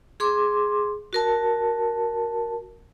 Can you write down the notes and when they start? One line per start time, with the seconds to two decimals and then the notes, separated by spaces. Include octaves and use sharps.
0.20 G#4 C6 D6
1.13 F#4 A#4 A5